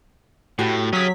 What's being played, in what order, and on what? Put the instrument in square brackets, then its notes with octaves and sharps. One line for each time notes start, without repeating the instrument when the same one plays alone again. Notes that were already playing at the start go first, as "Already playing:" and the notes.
[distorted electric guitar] A2 [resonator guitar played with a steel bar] F#4 G4
[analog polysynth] F#3 B6 [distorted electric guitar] C#4 G#4